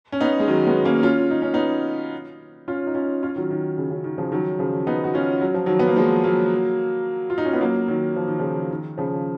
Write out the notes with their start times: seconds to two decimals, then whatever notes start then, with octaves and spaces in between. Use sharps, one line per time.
0.12 C#4
0.21 B3 D#4
0.40 G#3
0.48 D#3 F#3
0.67 G#3 B3
0.85 A#3 C#4
1.03 C#4 F4
1.31 D#4
1.42 C#4
1.54 B3 D#4
2.68 C#4 F4
2.87 D#4
2.95 C#4 F4
3.23 C#4 F4
3.35 D#3 F#3
3.50 D#3
3.78 C#3
3.91 C#3
4.04 D#3
4.18 C#3 F3
4.32 D#3 F#3
4.59 C#3 F3
4.87 B3 D#4
5.04 F#4
5.14 C#4 F4
5.41 F#3
5.54 F3
5.66 D#3 F#3
5.79 B3
5.88 A#3
5.96 F3 G#3
6.24 F#3 A#3
7.30 F4
7.38 D#4
7.45 C#4
7.53 B3
7.61 F#3 A#3
7.88 D#3 F#3
8.16 F3
8.28 D#3
8.39 C#3 F3
8.70 D#3
8.98 C#3 F3